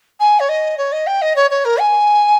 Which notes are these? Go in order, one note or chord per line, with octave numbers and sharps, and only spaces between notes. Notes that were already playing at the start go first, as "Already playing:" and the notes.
G#5
C#5
D#5
C#5
D#5
G5
D#5
C#5
C#5
A#4
G#5